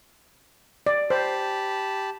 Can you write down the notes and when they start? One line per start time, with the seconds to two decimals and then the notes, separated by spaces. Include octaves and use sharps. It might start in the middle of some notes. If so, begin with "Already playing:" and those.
0.86 D5
1.10 G4 C5 A5 B5